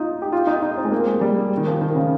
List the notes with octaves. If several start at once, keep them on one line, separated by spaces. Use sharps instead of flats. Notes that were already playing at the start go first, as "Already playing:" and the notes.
Already playing: D#4 F4
G4
F4
D#4
D#4
C4
G#3
A#3
G#3
G3
D#3
F3
D#3
C#3